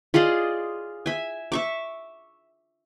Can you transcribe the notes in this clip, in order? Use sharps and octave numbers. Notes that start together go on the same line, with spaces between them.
F4 G#4 D5 D#5
E5 G#5
E5 C#6 D6